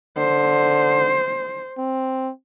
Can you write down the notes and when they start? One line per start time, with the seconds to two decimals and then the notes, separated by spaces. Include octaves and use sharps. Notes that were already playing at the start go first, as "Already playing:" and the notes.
0.18 D3 C5
1.78 C4